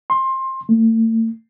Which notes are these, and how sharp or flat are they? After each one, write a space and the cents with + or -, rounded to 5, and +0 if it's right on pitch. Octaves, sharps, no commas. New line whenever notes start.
C6 +20
A3 +40